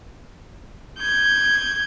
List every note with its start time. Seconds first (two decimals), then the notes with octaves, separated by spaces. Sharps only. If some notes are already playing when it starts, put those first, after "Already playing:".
0.98 G6 G#6